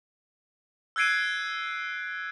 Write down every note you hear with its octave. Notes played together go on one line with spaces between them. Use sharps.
E6 F#6 G#6 C7 D7 D#7